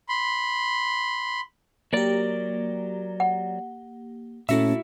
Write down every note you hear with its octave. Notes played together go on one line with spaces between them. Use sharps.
B5 C6
F#3 A#3 G4 A#4 D5
F#5
A#2 A3 C#4 E4 F#4 A4 E5